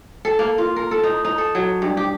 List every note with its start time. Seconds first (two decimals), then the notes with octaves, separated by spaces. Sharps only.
0.25 A4
0.39 A#3
0.58 F4
0.76 A#4
0.91 A4
1.04 D#4
1.25 D#4
1.38 A4
1.55 F#3
1.82 G2
1.97 G4